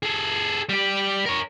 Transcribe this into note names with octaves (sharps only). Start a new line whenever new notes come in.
G#4 A4
G3 G4
A#4 C#5